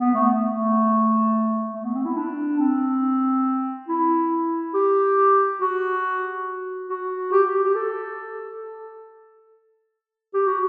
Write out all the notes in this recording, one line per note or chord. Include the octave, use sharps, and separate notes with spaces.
B3
A3
A3
A3
B3
C4
E4
D4
C4
E4
G4
F#4
F#4
G4
G4
G4
A4
G4
F#4